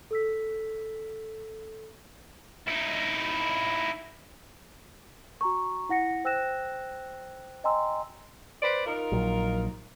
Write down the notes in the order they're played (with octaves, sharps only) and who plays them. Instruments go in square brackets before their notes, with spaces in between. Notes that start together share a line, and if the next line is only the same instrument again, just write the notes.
[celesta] A4 E6 B6
[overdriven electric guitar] D#4 E4
[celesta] F#4 A#5 C#6
E4 F#5 A#6 C#7
C5 G5 E6 F#6 A#6 E7
D#5 G5 G#5 A#5 C6 E6
[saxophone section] B4 C5 D5
D#4 F4 A#4
[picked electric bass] A#1 F#3